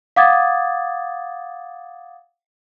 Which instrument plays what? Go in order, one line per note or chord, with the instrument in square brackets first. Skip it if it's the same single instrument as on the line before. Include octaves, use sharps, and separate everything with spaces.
[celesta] F5 F#5 D6 D#6 G#6 A6